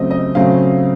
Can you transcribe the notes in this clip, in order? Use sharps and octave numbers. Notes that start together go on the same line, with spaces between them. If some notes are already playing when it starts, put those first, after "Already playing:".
Already playing: C#3 F#3 A3 C4 D#5
D#5
C#3 F#3 A3 C4 F5